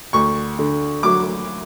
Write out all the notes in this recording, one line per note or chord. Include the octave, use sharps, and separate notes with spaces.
D2 C#6
D3
F#3 D6